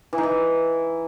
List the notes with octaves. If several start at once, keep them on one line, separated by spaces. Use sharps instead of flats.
E3
D#4
E3